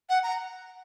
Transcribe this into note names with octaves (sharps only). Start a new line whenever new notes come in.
F#5
A#5